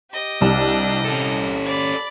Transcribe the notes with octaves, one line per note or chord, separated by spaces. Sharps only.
G4 D#5
C2 D4
C#4 A4
D5 B5